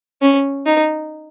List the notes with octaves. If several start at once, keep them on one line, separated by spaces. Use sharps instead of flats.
C#4
D#4